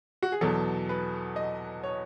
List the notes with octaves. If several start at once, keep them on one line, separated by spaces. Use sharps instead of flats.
F#4
G#4
E2 B2 F#3 A4
B4
D#5
C#5